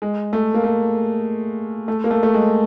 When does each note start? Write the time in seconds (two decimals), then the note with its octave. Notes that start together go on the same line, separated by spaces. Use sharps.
0.02 G#3
0.33 A3
0.54 A#3
0.64 A3
1.88 A3
2.04 A#3
2.11 A3
2.23 A3
2.34 G#3